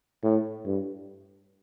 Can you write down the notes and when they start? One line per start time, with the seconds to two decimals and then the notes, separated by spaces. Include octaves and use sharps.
0.24 A2
0.66 G2